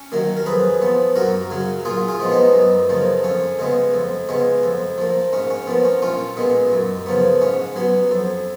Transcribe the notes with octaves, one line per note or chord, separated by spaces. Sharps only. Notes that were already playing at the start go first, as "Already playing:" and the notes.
Already playing: C#4
D#3 F#3 A#3
A#4
F2 G#4 B4
F3 B3
F#2 F#4 A#4
C#3 F#3
A#2 F4 G#4
F4 G#4
F3 G#3 B3
B3 D#4
F#2
C#3 F3 A#3
F2 C#4
C#3 G#3 B3
F2
C#3 G#3 B3
F2
F3 A#3
G#2 C#4
C#4
F3 A#3 B3
C#4
A#1 C#4 F4
A#2 G#3 B3
F#2
C#3 F3 B3
G#2 C#4
F#3 B3
F2